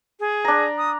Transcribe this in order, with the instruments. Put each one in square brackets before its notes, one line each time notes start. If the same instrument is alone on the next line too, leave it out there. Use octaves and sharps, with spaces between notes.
[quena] G#4
[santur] D4 A#5
[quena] D#6